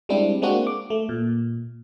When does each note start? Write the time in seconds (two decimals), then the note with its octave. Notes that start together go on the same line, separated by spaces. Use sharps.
0.09 G3 G#3 C4 D4 E4 G4
0.42 G#3 A#3 C4 D4 F#4
0.67 D6
0.90 A3
1.09 A#2